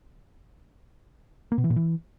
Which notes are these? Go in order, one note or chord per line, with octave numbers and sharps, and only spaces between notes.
A#3
B2
E3
A#2
E3